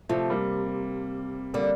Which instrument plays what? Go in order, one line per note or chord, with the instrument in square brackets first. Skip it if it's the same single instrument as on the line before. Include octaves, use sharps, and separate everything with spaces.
[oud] C3 [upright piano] F3 A3
[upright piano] G3 A#3
[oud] D3 [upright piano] G3 A#3